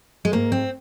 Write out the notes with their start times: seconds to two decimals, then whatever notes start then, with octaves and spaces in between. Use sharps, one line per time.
0.25 G#3
0.32 G#2 A#3
0.52 C4